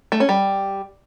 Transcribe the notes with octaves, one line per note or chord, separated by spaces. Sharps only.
A3
C#4
G3